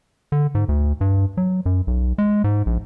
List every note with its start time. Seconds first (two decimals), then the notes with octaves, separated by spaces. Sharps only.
0.32 D3
0.55 G#2
0.69 D2
1.01 G2
1.37 F#3
1.66 F#2
1.87 B1
2.18 G#3
2.44 G#2
2.66 A#1